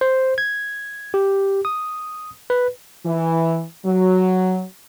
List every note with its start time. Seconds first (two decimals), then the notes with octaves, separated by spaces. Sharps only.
0.01 C5
0.38 G#6
1.14 G4
1.65 D#6
2.50 B4
3.05 E3
3.86 F#3